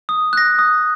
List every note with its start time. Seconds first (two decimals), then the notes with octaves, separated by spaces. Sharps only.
0.09 D#6
0.33 F#6 A#6
0.59 D#6